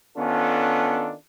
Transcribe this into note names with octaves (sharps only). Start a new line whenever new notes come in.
D#3 B3 C#4 D4 F4 A4